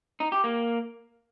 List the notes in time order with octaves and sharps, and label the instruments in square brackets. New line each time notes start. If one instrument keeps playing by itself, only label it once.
[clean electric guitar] D#4
G4
A#3